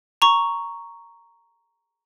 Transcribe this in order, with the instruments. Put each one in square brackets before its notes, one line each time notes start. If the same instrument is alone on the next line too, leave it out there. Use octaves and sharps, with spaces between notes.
[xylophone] A#5 C#6